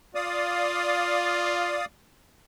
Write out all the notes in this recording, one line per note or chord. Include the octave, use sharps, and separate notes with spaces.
F4 D5 F5 D#6